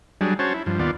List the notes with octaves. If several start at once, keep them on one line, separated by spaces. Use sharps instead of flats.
F#3 G3 D4 G#4
C#4 F#4 C5 C#5 A5
E4
G2 F3
D#2 B3 F4 D5